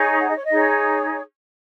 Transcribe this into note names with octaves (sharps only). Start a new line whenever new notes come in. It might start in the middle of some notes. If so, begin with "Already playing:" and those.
Already playing: D#4 G#4 C#5
F#5
D#5
C#5
D#5
D#4 G#4 C#5